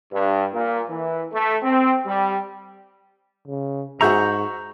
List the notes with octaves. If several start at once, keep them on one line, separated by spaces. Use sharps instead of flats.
G2
A#2
E3
A3
C4
G3
C#3
G#2 F#4 G#4 E5 A#5 C#6 G6